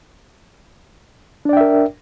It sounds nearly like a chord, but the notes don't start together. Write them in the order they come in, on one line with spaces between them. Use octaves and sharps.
D4 D5 G5 E5 A#4